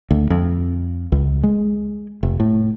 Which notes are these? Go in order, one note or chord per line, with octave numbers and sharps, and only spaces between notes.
D2
F2
C#2
G#3
F1
A2